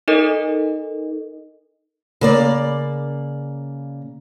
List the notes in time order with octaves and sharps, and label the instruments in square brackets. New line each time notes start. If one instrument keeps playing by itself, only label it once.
[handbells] D#4 A4 A#4 D#5
[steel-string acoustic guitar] C#3 A#3 D5